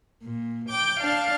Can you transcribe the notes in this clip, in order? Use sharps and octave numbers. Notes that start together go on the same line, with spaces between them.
A#2
G5 D6
D4 F5 A5